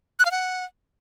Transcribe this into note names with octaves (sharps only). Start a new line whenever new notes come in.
F#6
F5
F#5